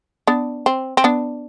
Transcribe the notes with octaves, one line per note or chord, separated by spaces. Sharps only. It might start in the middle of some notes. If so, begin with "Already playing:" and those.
B3 D4
C4
C4
B3 D4